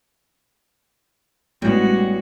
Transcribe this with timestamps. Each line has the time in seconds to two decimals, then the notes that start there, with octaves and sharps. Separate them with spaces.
1.62 A1 G3 G#3 B3 F#4